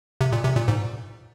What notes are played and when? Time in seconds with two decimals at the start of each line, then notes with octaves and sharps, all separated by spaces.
0.21 C3
0.32 A#2
0.44 C3
0.56 A#2
0.68 G#2